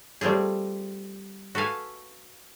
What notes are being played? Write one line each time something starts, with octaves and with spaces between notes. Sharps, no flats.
G3 A3 C4 F4 G#4
F#4 A4 B4 F5 G#5